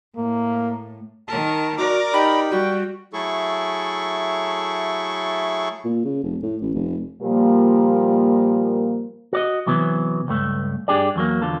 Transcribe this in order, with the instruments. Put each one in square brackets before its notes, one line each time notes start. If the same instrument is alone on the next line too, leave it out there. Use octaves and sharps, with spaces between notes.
[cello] A2 [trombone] A#3
[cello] D#3 A#4 [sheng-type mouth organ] A5
[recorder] F#4 [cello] A#4 D5 [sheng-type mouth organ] A#5 D6
[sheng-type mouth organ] D#4 G4 [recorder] B5
[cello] G3 [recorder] F#4 [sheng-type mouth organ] G5
[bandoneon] F#3 A3 E4 G#4 A4 C#6
[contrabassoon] A#2
C#3
F1
A2
A1
F1
[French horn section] A#2 F3 G3 A#3
[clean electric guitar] F#4 D5 D#5
C3 E3 F#3 B3
C#2 G2 A3
G2 D4 G4 G#4 D5
E2 F#3 A#3
E2 D3 F4 A4